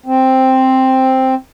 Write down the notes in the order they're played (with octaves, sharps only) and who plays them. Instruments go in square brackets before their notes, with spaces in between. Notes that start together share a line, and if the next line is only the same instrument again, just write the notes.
[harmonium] C4